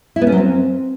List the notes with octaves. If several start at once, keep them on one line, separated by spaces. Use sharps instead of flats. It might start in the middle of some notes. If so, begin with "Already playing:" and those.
E4
B3
C#4
F#3
C4